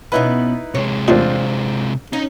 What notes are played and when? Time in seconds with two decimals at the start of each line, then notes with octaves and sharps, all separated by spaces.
0.12 B2 B3 C#4 D#4 E4 B4
0.75 C3 G#3 C#5
1.08 A1 E2 A#2 C4 D4 F4
2.13 C#4 D#4